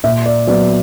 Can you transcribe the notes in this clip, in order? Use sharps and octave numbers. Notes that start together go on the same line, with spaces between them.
A#2 E5
D5
F#3 B3 D5